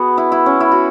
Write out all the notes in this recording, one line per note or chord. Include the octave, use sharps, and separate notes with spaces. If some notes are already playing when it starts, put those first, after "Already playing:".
Already playing: B3 F#4 G#4
E4
E4
C#4
E4
F#4